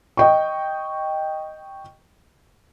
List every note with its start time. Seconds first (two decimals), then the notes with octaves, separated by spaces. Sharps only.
0.17 D#5 G5 C#6